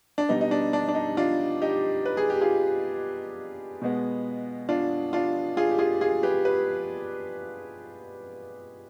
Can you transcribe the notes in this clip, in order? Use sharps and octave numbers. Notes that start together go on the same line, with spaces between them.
D4
B2 G3 B3 D#4
D#4
D4
D4
D4
D#4
D4 F4
D#4 G4
B4
G#4
G4
F4 G#4
B2 G#3 B3
D4 F4
D4 F4
F4 G#4
G4
F4 G#4
F4 G#4
G4 B4
B4